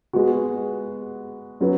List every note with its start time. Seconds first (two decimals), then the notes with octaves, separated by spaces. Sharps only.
0.13 G#3 B3 F#4
1.60 F#3 C#4 F#4 B4